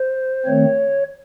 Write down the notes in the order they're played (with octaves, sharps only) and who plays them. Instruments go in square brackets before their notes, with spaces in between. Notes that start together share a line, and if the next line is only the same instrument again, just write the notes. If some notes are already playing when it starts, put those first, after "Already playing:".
Already playing: [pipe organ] C5
D#3 A3 C4 C#5